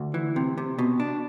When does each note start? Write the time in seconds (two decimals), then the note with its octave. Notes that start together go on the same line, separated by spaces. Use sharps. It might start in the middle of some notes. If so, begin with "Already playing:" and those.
Already playing: D2
0.14 E3
0.36 C3
0.58 C3
0.79 B2
1.00 D4